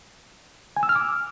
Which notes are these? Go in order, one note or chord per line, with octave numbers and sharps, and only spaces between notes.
G#5
E6
F6
D6